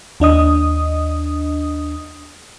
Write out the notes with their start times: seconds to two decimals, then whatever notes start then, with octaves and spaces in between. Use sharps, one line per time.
0.20 D#2 D4 D#5 D#6